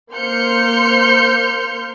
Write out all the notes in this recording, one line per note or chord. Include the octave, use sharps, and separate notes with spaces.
A#3 C5 C6 F6 G6 C#7